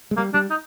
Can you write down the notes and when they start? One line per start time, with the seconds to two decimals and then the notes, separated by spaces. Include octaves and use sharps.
0.11 G#3
0.17 G3 A#3
0.34 G3 D4
0.50 D#4